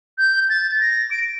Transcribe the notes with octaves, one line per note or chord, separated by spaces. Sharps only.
G6
A6
A#6
D7